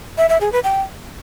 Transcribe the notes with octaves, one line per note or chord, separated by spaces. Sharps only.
E5
E5
G#4
B4
G5